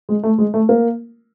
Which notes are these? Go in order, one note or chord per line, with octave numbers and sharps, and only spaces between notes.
G#3
A3
G#3
A3
A#3